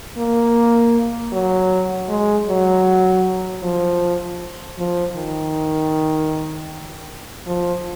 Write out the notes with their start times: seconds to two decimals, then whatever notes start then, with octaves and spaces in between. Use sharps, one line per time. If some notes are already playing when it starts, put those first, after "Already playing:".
0.17 A#3
1.32 F#3
2.09 G#3
2.48 F#3
3.63 F3
4.78 F3
5.16 D#3
7.47 F3